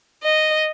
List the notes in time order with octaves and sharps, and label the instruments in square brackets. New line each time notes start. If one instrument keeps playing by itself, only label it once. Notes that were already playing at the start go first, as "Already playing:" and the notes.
[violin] D#5